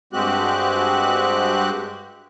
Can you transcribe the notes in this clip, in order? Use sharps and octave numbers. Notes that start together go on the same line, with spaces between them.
G2 G#3 C4 F#4 G4 F#6